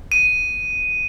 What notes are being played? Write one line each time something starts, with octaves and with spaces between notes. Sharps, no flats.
D#7